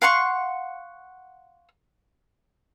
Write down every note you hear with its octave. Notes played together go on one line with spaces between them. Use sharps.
F5 F#5 C6 C#6